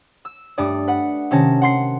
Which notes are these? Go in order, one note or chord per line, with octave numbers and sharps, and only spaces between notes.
E6
G2 A3 D5 D#6
B4 F#5
C3 D#3 C#4 A5 A#6
F#5 C6 C7